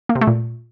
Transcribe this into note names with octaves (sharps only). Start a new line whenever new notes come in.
A#3
C3
A3
A#2